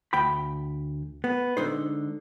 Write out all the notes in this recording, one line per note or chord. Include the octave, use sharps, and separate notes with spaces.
D2 G5 B5
B3
D3 G#3 D#4 C5